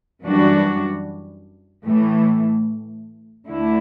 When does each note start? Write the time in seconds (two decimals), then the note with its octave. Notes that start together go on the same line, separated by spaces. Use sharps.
0.24 F#2 E3 G3 D4 F#4
1.86 A2 E3 A3
3.48 D2 D3 A3 E4